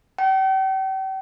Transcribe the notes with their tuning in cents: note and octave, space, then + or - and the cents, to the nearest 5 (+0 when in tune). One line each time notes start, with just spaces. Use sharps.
G5 -40